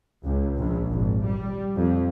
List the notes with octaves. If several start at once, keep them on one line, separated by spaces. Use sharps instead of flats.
C#2
A#1
G#1
G3
F2